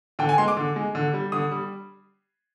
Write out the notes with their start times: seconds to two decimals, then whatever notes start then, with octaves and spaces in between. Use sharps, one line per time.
0.19 D3 G5
0.29 G#5
0.38 G#3 C6
0.48 D6
0.57 D3
0.76 G#3
0.95 D3
1.13 G3
1.32 D3 D#6
1.51 G3